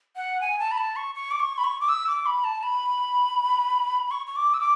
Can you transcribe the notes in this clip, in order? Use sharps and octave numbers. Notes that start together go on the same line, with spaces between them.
F#5
G#5
A5
B5
A5
C#6
C#6
D6
C#6
B5
C#6
D6
E6
D6
B5
A5
B5
C#6
C#6
D6
E6
D6